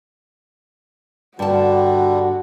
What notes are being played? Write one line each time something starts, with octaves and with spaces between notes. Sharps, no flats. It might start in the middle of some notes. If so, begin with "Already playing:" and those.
G2 D3 G3 F#4 A5